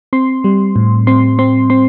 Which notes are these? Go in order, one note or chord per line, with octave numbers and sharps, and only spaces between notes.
C4 C6
G3
A2
C4 C6
C4 C6
C4 C6